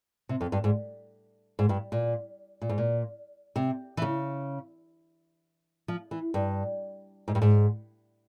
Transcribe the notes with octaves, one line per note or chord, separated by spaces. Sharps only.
C3
F2
G2
G#2
G#2
G2
A#2
A#2
G#2
A#2
C3
E3
C#3
F3
E3
G2
G#2
G2
G#2